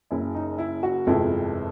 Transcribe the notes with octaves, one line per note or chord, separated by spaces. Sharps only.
F#1 F#2 C#3 E4
D#4
E4
F#4
G1 F2 C3 F3 G#3 E4